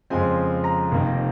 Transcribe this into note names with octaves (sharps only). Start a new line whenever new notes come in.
F2 C#3 F3 G#3 C4 G#5
A#5
F1 F2 D#3 A#3